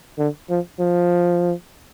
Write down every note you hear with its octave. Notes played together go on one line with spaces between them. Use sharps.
D3
F3
F3